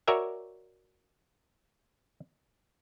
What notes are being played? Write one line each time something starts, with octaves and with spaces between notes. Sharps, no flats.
F#4 A#4 C#5 D5 E5 G#5